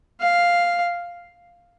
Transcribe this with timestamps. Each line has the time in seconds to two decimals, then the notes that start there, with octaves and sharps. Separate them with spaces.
0.21 F5